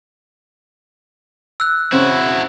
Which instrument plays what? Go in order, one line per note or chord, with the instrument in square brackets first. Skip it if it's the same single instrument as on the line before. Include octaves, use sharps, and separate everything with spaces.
[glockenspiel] E6 F#6
[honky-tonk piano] C#3 C4 [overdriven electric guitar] E4 F#4